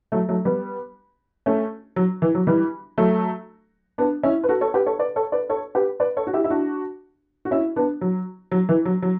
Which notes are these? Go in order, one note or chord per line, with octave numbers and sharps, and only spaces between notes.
F#3 A3
F#3 A3
G3 B3
A3 C#4
F#3
E3
F#3
E3 G3
F#3 A3
B3 D4
C#4 E4
B4
F#4 A4
A4 C#5
G4 B4
A4 C#5
B4 D5
A4 C#5
B4 D5
A4 C#5
G4 B4
B4 D5
A4 C#5
F#4
E4 G4
E4
D4 F#4
F#4
C#4 E4
B3 D4
F#3
F#3
E3
F#3
F#3